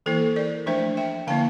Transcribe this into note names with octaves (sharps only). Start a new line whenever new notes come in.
E3 A#3 E4 A4 C5
A#4 D5
F3 A3 D4 C5 E5
E5 G5
D3 F3 A#3 E4 F5 A5